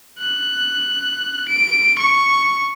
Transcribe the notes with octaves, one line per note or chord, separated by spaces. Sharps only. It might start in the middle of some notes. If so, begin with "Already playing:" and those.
F#6
D7
C#6